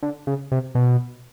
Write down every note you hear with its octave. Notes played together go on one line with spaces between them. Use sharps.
D3
C#3
C3
B2